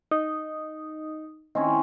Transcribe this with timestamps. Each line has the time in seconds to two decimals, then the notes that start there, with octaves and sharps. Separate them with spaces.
0.11 D#4
1.55 D#3 C4 C#4 E4